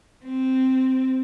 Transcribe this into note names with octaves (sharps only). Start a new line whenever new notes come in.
C4